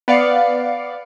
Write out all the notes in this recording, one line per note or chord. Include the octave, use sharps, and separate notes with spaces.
B3 D5 F5 C#7